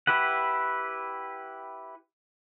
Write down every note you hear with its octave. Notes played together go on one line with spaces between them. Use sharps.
E4 G4 B4 F#5